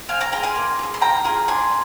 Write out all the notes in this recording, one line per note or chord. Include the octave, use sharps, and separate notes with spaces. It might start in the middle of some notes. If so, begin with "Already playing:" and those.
C4 F5 G#5
G5 A#5
F4 G#4 G5 A#5
G#5 C6
A#3
F4
G#4
C6
A#3 G5 A#5
F4 G#4
D4 G#5 C6